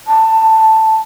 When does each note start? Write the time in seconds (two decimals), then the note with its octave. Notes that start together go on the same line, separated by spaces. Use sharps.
0.07 A5